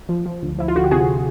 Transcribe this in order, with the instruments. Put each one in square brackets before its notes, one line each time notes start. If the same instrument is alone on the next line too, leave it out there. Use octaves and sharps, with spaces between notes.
[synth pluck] F3
F3
D2
F3 E4
F4
D3 F#4
G4
C3 F#4 G#4